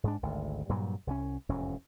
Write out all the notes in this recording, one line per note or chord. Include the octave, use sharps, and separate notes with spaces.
G#2 G#3 D4
G#1 D2
G2 A#2 F#3 G3
C2 E3 C#4
F1 E2 G#2 C#4